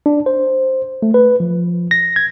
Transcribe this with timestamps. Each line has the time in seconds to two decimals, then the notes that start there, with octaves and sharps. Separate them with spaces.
0.06 D4
0.26 C5
1.03 A3
1.14 B4
1.40 F3
1.91 A#6
2.16 G#6